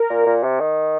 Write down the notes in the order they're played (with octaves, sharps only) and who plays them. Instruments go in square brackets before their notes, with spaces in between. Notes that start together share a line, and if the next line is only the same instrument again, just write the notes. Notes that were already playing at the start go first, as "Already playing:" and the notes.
Already playing: [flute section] A#4
[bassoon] A#2
A#2
C3
D#3